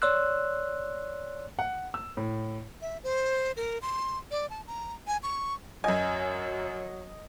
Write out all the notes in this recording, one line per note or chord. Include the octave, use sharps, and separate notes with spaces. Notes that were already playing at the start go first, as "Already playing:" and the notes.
C#5 D5 C6 E6 F#6
F#5
E6
A2
E5
C5
A#4
C6
D5
A5
A#5
G#5
C#6
F#2 F#3 D#5 G#5